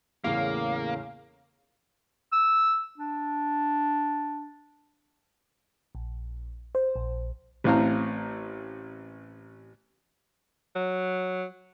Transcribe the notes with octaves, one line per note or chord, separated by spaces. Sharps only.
E2 A2 C#3 A#3 F5
E6
D4
A#1
C5
A#1
A1 A2 C4 F5 A#5
F#3